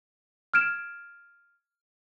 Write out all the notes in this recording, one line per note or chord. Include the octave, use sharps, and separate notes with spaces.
F6 G#6 D7 E7